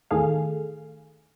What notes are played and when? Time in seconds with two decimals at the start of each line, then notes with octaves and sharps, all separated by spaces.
0.11 E2 A2 D#3 G#4 A4 F5